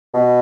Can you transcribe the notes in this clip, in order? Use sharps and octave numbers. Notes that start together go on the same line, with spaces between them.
B2